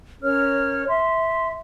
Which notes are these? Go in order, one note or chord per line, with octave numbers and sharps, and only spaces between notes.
C#4 A#4 C#5 F6
E5 C6